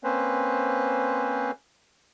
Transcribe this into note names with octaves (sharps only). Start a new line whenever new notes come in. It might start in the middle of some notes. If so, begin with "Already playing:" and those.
A#3 C4 C#4 B4 C5